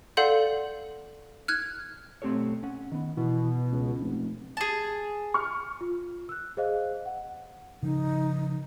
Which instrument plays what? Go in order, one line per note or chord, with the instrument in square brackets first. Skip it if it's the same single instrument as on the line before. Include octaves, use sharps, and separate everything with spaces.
[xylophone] A4 D5 F5 F#5 C6 G6
F6 F#6 G#6
[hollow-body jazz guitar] B1 A3 C4 G4 A4 C#5
C#4 F#5
D#3 B3
[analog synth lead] B2 [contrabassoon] E3
[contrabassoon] C#2
F1
[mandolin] G#4 A5
[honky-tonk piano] C#6 F6
[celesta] F4
E6 F#6
G#4 C5 D#5 F5 F#6
F#5
[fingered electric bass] C#3 F3 [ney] D#4